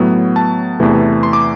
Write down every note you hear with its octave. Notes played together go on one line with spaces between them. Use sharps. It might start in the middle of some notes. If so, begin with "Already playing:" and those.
Already playing: A2 F#3 B3
A5
E2 C3 E3 A3
C6
D6